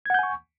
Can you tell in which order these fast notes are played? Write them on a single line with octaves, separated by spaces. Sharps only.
G#6 F#5 G6 G#5 C#6